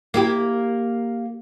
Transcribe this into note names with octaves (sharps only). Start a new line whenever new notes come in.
A#3 E4 G4